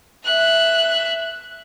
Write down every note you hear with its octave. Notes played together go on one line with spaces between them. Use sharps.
E5 F#6